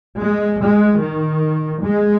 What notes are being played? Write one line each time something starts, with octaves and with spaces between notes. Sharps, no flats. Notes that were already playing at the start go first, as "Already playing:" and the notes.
G#3
G#3
D#3
G#3